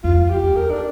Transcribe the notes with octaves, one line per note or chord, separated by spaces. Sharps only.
F2 F4
G4
E2
A#4
D4